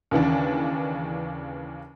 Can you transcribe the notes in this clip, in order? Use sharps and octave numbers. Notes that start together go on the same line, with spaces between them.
D#2 C#3 E3 D4